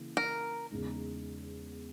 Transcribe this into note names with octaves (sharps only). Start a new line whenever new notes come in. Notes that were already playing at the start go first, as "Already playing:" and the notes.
Already playing: C#3 E3 A#3
A#4
E2 C#3 G#3 D#4